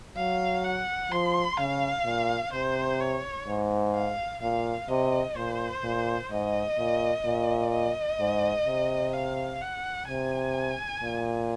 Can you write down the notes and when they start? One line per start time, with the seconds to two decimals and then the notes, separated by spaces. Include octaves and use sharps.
0.16 F#3 F5
0.64 F#5
1.11 F3 C6
1.58 C#3 F5
2.05 A#2
2.53 C3 C5
2.99 C#5
3.47 G#2
3.94 F5
4.42 A#2 F5
4.88 C3 D#5
5.36 A#2 C5
5.83 A#2
6.31 G#2 D#5
6.78 A#2
7.25 A#2
7.72 D#5
8.20 G#2
8.67 C3
9.13 F5
9.61 F#5
10.08 C3 G#5
11.03 A#2